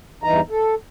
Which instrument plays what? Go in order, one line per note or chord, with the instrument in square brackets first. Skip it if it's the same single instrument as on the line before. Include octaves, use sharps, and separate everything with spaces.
[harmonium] E2 G2 E3 D#4 A#5
A4